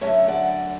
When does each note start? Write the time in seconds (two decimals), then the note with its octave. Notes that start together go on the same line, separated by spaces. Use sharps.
0.01 F#2 D3 A3 C#5 E5
0.28 D5 F#5